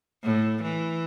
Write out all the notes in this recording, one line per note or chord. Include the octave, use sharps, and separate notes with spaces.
A2
E3